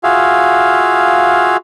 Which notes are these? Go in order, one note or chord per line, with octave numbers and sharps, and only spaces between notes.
F4 F#4 G#4 E5 F5